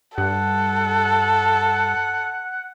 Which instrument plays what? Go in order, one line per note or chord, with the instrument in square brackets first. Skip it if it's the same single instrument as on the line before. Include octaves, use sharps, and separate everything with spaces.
[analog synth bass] G2 [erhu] A4 [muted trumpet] F#5